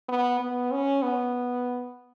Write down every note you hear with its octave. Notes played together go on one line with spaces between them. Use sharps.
B3
B3
C#4
B3